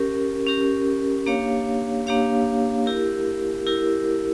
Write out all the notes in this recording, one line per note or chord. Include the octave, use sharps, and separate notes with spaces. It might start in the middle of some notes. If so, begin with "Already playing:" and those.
Already playing: C#4 G4 A#4
C#4 G4 A#4
A#3 D4 G4 C#5 F5
A#3 D4 G4 C#5 F5
E4 G4 A#4
E4 G4 A#4